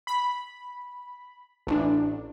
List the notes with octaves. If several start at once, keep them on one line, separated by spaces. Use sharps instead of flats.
B5
A1 D4